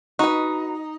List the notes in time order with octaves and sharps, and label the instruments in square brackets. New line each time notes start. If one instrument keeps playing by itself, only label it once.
[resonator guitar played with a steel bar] D#4 [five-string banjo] F#4 B4